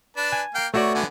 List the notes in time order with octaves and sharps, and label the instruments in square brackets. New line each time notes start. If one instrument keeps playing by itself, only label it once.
[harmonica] D4 B4 A5
[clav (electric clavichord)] G#5
[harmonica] A#3 F5 G5
[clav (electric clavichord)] A3 F#4 D5 [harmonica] B3 C#5
[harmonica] D3 B3 G#5